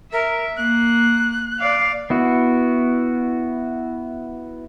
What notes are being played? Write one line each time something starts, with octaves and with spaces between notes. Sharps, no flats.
A#4 E5
A#3 F#6
D5 F5
B3 E4 F#4